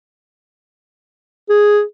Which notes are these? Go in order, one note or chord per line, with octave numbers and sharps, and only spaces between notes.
G#4